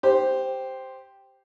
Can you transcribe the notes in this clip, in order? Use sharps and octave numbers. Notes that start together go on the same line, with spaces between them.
G4 C5